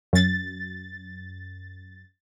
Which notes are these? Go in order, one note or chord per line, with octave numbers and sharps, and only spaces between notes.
F#2 A6